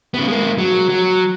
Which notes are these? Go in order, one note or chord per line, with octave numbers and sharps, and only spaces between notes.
C#3 B3
G#3 A#3
F#3
F#3